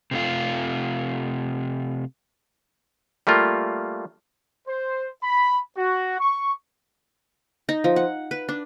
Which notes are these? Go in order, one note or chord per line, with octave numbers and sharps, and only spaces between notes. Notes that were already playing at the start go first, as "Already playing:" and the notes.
C3 A3 F4
G3 A3 A#3 F4
C5
B5
F#4
C#6
D#4
F3
F#5
B4
D4